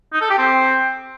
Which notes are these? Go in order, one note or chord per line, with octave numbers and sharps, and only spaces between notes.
D#4
A4
G4
C4